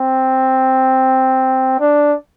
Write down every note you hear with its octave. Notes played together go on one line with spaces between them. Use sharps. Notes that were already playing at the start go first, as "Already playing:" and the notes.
Already playing: C4
D4